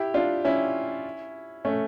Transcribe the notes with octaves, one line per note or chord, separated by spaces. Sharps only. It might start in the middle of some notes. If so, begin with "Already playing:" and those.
Already playing: E4 G4
D4 F4
C#4 E4
A3 C#4